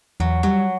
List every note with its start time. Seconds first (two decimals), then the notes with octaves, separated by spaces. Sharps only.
0.20 E2 F#3
0.43 F#3 G3